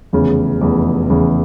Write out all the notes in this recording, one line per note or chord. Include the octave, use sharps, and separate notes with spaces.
F1 E2 C#3
F1 E2 C#3
F1 E2 C#3